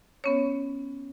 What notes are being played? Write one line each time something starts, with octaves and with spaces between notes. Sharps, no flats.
B3 C#4 C#5